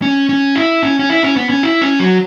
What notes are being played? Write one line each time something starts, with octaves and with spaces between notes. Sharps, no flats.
C#4
C#4
E4
C#4
C#4
E4
C#4
B3
C#4
E4
C#4
F#3